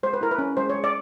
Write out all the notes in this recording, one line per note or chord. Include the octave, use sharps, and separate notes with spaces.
G#3 C5
B4
E4 A#4
B4
C#4
G#3 C5
C#5
G#3
D5